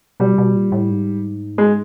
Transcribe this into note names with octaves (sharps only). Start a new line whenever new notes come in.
B2 G3
B2
A#2
A2
G#2
G#3